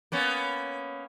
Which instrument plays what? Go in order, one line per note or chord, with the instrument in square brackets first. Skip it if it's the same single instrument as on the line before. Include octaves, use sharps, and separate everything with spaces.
[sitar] A#3 B3 C#4